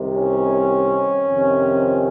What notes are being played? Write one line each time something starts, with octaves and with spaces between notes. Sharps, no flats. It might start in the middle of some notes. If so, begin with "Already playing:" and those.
Already playing: C2 C3 D#3
C#4
F2 C3 D#3